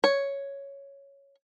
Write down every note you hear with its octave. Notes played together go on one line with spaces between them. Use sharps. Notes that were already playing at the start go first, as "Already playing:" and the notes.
C#5